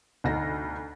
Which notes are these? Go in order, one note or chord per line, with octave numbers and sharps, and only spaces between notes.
D2 D#4 A#6